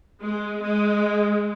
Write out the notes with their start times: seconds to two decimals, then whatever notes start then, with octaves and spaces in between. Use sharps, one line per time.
0.21 G#3
0.63 G#3